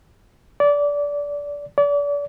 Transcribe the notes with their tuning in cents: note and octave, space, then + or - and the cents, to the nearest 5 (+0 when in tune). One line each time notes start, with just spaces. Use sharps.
D5 -20
D5 -35